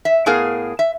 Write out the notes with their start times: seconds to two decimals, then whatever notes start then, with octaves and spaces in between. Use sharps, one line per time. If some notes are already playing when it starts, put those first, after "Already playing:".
0.05 E5
0.26 A2 B3 G#4 A#4 F5
0.79 E5